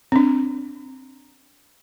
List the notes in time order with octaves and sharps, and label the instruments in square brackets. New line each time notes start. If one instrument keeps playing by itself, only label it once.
[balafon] C4 D4